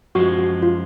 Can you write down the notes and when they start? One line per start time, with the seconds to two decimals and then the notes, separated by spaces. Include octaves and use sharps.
0.15 F#2 F3 G#3 F#4
0.38 F#4
0.63 F4